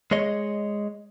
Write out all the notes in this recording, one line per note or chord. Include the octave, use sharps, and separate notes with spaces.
G#3 G#4 C#5 D#5